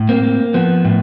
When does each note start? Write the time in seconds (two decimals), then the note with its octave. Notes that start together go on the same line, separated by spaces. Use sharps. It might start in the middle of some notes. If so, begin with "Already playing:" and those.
Already playing: A2
0.09 A#3 C4
0.23 A#3
0.54 F3 B3
0.85 A2